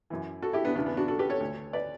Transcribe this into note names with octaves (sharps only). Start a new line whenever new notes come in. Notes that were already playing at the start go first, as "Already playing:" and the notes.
F#2 E3
F#4 A4
E4 G4
B3 D4
E2 C#3 E3 B3 D4
B3
D4 F#4
F#4 A4
G4 B4
A4 C#5
D2 D3
B4 D5